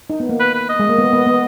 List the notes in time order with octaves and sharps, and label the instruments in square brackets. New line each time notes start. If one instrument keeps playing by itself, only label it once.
[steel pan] D#4
B3
A#3
[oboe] B4
B4
D#5
[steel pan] G#3
A#3
B3
B3
B3